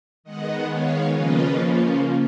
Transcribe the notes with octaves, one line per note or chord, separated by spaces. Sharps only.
D#3 G#3 B3 D#5 F#5
C#5 F5
C#3 F3 A#3 C#4 F4 B4 D#5